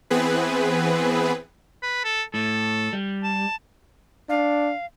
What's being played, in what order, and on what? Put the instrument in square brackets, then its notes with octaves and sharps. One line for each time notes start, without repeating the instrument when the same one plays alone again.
[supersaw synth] E3 B3 C4 G#4 B4
[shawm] B4
A4
[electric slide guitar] A2 [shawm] A4
[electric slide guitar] G3
[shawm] A5
[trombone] D4 [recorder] F5